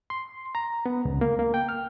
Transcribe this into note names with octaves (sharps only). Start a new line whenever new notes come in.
C6
A#5
B3
C#2
A#3
A#3
G5
F6